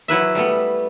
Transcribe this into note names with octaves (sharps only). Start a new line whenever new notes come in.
F#3 E4 B4 E5
G3 A3 B3